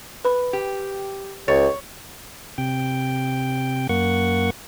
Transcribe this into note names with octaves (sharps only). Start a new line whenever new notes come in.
B4 B5
G4
C#2 C#5 A6
C3 G5
F#2 A#3 F#5 C#6